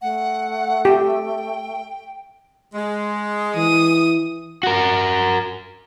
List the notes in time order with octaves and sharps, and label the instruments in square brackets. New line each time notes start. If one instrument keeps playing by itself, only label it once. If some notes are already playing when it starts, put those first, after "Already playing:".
[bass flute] A3 [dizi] F#5
[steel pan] G4 [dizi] G5
[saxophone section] G#3
[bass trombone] E3 [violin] D#6
[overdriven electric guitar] F#4 A#4